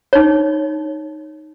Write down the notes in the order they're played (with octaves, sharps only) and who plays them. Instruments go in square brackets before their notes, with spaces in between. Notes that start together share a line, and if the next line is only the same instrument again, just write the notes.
[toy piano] D#4 C#5